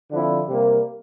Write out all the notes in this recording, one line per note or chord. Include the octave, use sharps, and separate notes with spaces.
D3 F3 C4 E4
C3 G3 A#3